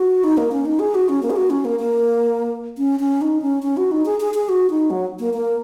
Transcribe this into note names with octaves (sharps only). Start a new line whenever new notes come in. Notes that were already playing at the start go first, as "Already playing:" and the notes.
Already playing: F#4
D#4
A#3
C#4
D#4
G#4
F#4
C#4
A#3
G#4
F#4
C#4
A#3
A#3
C#4
C#4
D#4
C#4
C#4
F#4
D#4
G#4
G#4
G#4
F#4
D#4
F#3
A#3
A#3